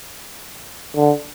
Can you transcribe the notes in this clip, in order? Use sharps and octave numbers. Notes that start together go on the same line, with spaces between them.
D3